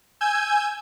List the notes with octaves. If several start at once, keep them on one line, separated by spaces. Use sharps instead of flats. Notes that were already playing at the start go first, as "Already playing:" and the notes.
G#5 E6 G6 G#6